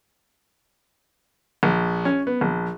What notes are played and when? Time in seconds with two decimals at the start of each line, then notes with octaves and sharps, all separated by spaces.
1.63 A#1
2.05 C#4
2.27 B3
2.41 A#1